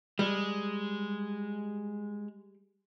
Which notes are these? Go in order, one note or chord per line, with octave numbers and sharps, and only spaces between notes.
G3 G#3